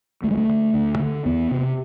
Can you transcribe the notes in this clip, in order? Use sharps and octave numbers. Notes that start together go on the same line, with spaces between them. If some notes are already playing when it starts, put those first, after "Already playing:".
D2 A3
G#3
A3
D3
D2
D3
E2 B3
C3